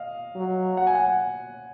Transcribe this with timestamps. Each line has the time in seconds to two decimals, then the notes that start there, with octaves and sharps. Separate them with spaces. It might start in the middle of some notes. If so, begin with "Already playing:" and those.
Already playing: D#5 F5
0.36 F#3
0.77 F#5
0.87 G#5
0.95 F#5